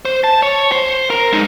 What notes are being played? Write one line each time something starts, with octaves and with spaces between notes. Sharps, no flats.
C5
A5
C#5
C5
A#4
G#3 D#4